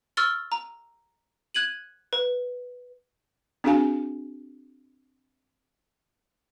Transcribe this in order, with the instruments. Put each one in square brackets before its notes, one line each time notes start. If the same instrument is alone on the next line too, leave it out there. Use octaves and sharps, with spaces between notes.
[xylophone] C#6 E6 F6 A6 G7
A#5
F#6 G#6 D#7 F#7
B4
[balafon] C4 D4 F#4 G#4 F5 G#5